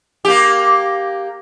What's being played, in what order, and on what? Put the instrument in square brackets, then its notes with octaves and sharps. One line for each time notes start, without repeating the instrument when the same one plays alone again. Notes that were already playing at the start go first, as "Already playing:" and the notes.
[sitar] A#3 G4